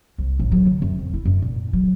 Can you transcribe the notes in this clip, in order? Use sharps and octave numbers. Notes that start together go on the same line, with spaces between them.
C2
A1
F#3
D3
F#2
F2
E4
F#2
A#2
F#3